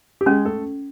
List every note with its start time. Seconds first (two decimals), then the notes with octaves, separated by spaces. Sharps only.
0.21 G4
0.26 G#3 C#4 G#4
0.45 A3 A4